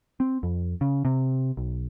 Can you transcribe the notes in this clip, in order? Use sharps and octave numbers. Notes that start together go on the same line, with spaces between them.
C4
F2
C#3
C3
B1